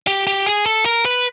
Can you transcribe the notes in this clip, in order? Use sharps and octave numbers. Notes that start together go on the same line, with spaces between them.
G4
G4
G#4
A4
A#4
B4